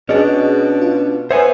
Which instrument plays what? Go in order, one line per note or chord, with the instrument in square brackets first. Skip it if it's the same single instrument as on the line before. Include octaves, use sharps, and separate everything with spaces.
[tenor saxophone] B2 [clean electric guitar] C#4 D4 [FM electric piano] G#4 D#5
[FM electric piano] F4
[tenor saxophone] B3 [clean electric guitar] C5 C#5 G#5 [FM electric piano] E5